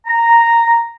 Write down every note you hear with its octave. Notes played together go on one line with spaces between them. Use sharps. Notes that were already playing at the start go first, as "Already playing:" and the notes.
A#5